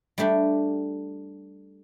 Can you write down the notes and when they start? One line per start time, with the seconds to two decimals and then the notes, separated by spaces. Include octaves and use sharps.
0.18 G3 A3 D4 G4